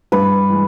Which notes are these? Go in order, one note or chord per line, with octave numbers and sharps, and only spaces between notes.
G2 B4
E3 G#3